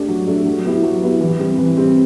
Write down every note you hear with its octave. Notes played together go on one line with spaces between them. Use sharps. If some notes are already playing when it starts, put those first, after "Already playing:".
Already playing: A3 D4 G4
F#3
A3 D4 G4
F#3
B3 E4 G4
F#3
B3 E4 G4
E3
G3 C4
E3
G3 C4